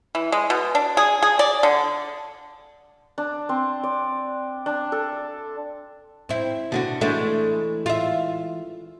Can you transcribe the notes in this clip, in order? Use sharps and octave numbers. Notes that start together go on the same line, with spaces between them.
E3
G#3
B2
D4
G#4
G#4
D5
D3
D4
C4
D5
D4
A4
C4 E4
B2 D3 F#4
E3 G#3 A3 D4
F4 E5